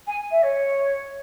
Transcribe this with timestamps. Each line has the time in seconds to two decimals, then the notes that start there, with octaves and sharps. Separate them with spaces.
0.07 G#5
0.31 E5
0.43 C#5